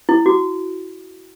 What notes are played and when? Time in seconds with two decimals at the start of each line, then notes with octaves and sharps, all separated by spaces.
0.09 E4
0.26 F#4